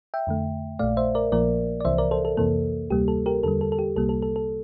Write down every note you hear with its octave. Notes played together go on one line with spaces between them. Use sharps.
E5 G5
F2 D3 A3
A#1 A#2 A3 D5 F5
C5 E5
A#4 D5
A#1 A#2 F3 A#3 A#4 D5
D5
C2 C3 E3 C5 E5
A#4 D5
A4 C5
A4
F2 C3 E3 A#3 A4
D2 C3 G3 A#3 G4
A4
G4 A#4
E2 D3 G3 A4
A4
A4
G4
C2 C3 G3 A#3 A4
A4
A4
A4